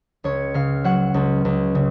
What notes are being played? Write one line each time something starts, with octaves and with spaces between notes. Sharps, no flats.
C#2 C#5
C#3 F5
F#3 F#5
C#2
C#2
C#3